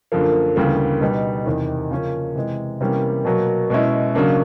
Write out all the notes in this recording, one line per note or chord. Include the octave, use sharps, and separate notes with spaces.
F#2 D3 F3 A#3
D2 C#3 E3 G3 A#3
B2 G3 B3 D#4
E2 C3 D#3
C#3 F3 A#3 C#4
C3 E3 G#3
C3 E3 G3 A#3 C#4
B2 F#3 A#3
B2 G#3 C#4 E4
C#3 F#3 A#3 D4